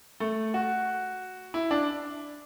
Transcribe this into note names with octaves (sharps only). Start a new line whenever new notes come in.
A3
F#4
E4
D4